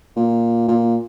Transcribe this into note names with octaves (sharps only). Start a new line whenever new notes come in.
A#2
A#2